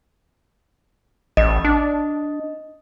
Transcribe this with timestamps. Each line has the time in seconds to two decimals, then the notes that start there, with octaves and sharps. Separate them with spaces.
1.37 A1 D#5
1.65 D4